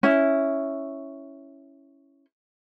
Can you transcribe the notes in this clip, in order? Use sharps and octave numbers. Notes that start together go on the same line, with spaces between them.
C#4 E4